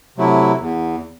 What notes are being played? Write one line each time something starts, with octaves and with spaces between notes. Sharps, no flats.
C3 F#3 A3 E4
E2